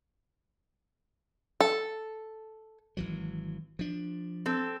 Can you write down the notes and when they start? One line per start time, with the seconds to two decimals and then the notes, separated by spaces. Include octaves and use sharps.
1.60 A4
2.97 G#1 E3 F#3
3.79 F3 D4
4.46 C4 A4